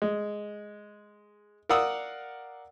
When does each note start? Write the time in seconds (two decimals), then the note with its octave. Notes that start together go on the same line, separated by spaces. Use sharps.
0.02 G#3
1.69 A#4 D5 F5 F#5 D#6 E6